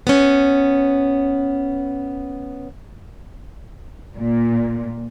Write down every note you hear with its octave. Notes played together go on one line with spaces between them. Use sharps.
B3 C#4
A#2